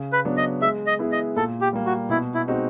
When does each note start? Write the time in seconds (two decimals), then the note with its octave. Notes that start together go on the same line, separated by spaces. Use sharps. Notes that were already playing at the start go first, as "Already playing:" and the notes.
Already playing: C#3
0.13 B4
0.25 F#3 B3 D4
0.37 D#5
0.61 G#3 E5
0.87 D#5
0.99 B3 E4 G#4
1.12 D#5
1.36 A#2 A4
1.61 G4
1.73 G3 A#3
1.86 F#4
2.10 B2 E4
2.34 E4
2.47 G#3 C4 D#4 F#4